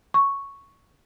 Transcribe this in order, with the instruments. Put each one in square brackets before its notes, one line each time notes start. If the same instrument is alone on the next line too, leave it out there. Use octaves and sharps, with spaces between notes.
[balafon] C#6